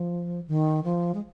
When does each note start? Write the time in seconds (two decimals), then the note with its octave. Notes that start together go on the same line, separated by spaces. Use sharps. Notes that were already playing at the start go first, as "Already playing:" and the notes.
Already playing: F3
0.48 D#3
0.84 F3
1.14 G#3